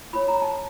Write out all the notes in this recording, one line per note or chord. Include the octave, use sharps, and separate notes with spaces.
F4 A#4 C#5 B5
A#5
A5